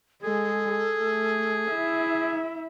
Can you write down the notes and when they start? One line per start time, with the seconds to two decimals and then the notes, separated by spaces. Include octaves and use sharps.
0.23 G#3 G#4 A4
0.99 A3
1.72 E4 E5